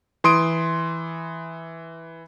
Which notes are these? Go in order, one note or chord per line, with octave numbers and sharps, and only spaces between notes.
E3 C6 D#6 D7